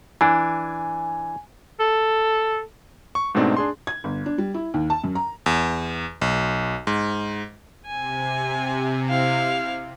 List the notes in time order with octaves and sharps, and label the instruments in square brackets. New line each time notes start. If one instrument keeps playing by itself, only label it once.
[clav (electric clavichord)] E3 D4 [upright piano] G#5
[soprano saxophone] A4
[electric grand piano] C#6
G#2 B2 A3 C4 D4 D#4
D4 G#4 C6
[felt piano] G#6
G1
D4
G3
E4
D#2
A5
F#2
A#5
[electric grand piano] E2
B1
G#2
[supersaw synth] C3 [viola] G#5
[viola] E4 F5